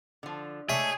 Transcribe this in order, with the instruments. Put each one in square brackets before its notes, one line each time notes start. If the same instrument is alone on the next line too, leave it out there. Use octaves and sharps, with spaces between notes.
[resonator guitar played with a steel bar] D3 F3
[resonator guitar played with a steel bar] A3 D5 E5 [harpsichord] D#4 C#5 [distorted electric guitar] G#4